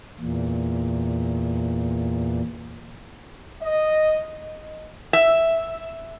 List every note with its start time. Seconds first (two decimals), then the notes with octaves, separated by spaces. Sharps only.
0.20 E2 A#2
3.62 D#5
5.13 E5